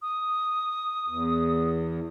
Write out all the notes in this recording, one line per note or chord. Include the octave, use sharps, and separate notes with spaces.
D#6
E2